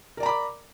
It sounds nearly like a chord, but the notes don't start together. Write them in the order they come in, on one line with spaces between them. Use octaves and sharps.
A#4 D5 A#5 B5 D6